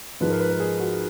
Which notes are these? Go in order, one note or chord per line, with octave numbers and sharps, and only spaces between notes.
G#2 F3 G#3 B4
A#4
B4
A#4
G#4
F#4